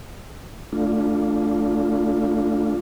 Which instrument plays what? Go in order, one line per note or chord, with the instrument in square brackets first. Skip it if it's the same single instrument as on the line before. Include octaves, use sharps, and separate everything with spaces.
[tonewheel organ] A3 D4 F4